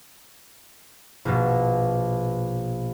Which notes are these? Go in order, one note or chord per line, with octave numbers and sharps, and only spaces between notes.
A#1 B2